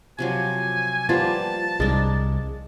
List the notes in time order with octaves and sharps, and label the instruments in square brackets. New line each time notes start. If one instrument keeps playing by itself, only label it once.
[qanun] C3 F3 F#3 [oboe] G#5
[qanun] F3 G3 A#3 [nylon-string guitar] B3 F4 [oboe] A5
[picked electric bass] C2 [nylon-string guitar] G#3 [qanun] D4 A#4